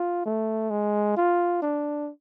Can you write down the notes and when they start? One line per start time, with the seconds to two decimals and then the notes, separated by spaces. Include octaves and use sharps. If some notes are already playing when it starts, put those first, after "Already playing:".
Already playing: F4
0.26 A3
0.71 G#3
1.17 F4
1.62 D4